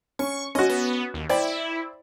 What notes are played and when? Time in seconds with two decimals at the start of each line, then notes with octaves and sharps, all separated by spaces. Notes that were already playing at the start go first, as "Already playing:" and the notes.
0.19 C#4 C#6
0.55 C#4 F#4 D#5
0.69 B3
1.14 D#2
1.29 E4 C5 D5 G5